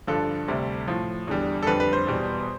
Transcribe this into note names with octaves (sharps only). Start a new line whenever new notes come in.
G2 D3 F3 A4
D2 C3 G3
A2 F3
E2 D3 G3
A4
F2 D3 G3 B4
B4
C5
E2 B2 G3